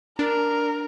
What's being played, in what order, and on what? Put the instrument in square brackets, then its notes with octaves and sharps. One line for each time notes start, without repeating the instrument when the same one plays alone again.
[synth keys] D4 [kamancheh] A#4